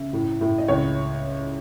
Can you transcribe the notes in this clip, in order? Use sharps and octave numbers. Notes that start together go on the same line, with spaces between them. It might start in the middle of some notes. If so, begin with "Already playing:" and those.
Already playing: C#3 E5
A2
A2
D#5
C#2 C#5